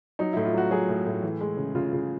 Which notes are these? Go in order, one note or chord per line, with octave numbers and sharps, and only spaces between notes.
F#3 D#4
A2 E4
F4
F#3 F#4
F#3 G#4
A2
A2
E3
G#3
C#3
C#3 F4
C#3